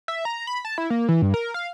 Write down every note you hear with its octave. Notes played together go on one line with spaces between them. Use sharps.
E5
A#5
B5
A5
E4
A#3
E3
G2
A#4
F5